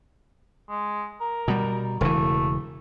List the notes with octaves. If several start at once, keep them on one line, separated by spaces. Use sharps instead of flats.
G#3
A#4
B2 G3
E1 C#3 E3 A3